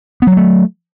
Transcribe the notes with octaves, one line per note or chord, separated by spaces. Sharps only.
F#3 G3 A3 B3